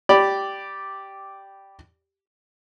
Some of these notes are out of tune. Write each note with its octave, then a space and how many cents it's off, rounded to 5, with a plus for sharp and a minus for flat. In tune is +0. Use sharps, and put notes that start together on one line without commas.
G4 -5 D5 +0 B5 +0